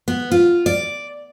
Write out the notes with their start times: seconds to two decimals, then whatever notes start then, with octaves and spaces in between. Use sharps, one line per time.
0.08 B3
0.32 F4
0.66 D5